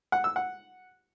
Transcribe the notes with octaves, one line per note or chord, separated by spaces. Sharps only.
F#5
E6
F#5